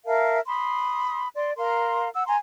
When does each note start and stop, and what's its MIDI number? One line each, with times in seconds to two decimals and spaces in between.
0.06 0.39 70
0.06 0.39 76
0.06 0.39 77
0.06 0.39 81
0.46 1.27 83
0.46 1.27 84
0.46 1.27 87
1.35 1.51 74
1.35 1.51 84
1.57 2.08 70
1.57 2.08 77
1.57 2.08 82
1.57 2.08 84
2.13 2.22 78
2.13 2.22 88
2.27 2.36 80
2.27 2.36 82
2.27 2.36 84